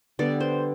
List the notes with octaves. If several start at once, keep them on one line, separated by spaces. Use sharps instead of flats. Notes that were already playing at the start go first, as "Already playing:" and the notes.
D3 G3 B3 D5
C5